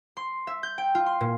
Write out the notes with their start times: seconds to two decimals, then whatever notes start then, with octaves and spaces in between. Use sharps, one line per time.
0.17 C6
0.47 E5
0.63 G6
0.78 G5
0.95 F4
1.06 C6
1.21 A#2